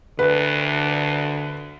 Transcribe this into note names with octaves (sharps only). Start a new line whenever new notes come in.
D2 D3 B4